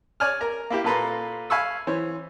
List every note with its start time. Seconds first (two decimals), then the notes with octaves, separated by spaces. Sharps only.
0.20 C#5 D5 G#5 F6
0.41 A#4 A#5
0.70 A#3 E4 G4
0.84 A#2 A#3 A4 B4 A#5 C6
1.50 F5 G#5 B5 C#6 E6
1.87 E3 C5 C#5